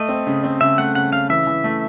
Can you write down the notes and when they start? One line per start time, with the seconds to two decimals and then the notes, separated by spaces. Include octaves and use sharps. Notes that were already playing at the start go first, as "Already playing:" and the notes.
Already playing: A3 D#5
0.09 C4
0.27 C#3
0.44 C4
0.61 C#3 E5
0.78 A3 F#5
0.95 C#3 F#5
1.13 C#3 F5
1.30 E3 E5
1.47 E3
1.64 A3